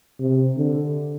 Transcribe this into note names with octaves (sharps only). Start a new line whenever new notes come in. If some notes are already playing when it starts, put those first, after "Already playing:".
C3
D3